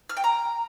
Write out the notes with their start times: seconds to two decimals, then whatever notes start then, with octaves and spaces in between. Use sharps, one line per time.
0.10 F6
0.17 G5
0.24 A#5